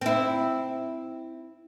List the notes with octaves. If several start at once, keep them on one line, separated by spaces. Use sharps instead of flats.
C4 E4